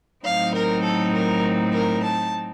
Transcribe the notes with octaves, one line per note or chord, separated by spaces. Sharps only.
A2 F#3 C4 D#4 F5
A#4
A4
A#4
A#4
A5